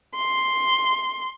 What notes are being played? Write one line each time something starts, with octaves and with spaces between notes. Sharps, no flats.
C6